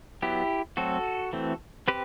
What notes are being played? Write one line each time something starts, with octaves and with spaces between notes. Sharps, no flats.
F#3 B3 E4 G4
F#3 A3 C4 F#4 A4
E3 A3 C4
C4 G4 B4